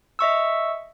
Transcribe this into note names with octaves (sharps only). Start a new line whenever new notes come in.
D#5 E5 C#6 E6